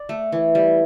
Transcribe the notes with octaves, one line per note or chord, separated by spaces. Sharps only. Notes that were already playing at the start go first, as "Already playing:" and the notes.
Already playing: D5
A3
E3
G3